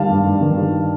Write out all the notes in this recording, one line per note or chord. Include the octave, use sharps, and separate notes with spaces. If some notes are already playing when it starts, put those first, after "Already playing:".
Already playing: D#3 G3 F5 A5
G2
G2
D#3
G3